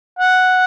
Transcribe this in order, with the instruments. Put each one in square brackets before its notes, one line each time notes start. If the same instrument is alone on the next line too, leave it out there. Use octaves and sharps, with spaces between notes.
[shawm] F#5